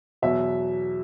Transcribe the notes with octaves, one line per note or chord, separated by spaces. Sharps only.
E2 B2 F#3 E5